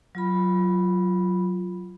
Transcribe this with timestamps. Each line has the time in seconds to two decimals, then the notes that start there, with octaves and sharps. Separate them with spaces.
0.15 F#3 F4 B5